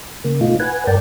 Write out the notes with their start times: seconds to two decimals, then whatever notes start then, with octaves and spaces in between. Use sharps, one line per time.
0.24 C#3 A#3
0.41 B2 A3 D#4 F4
0.60 B4 F#5 G#5
0.87 G2 A#4 D5 G5 A5